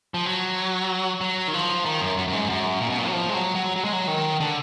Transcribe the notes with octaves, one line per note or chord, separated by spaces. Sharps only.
F3
F#3
F#3
D#3
F3
D#3
F#2
F#2
F#2
G#2
F#2
A#2
B2
A#2
F#3
F3
G#3
F#3
F#3
F#3
G#3
F#3
D#3
D3